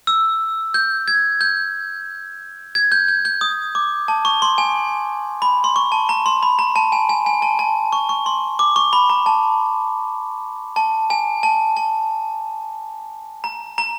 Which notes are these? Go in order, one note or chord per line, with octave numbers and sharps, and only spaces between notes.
E6
G6
G#6
G6
G#6
G6
G6
G6
D#6
D6
A5
C#6
C6
G#5
B5
C6
C#6
A5
A#5
C6
B5
A#5
A5
G#5
G#5
G#5
A5
A5
C#6
C#6
C6
D6
C#6
B5
A#5
A5
A5
G#5
A5
A5
A#5
A#5